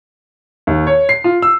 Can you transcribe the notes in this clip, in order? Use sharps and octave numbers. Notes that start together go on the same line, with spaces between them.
D#2
C#5
C7
F4
E6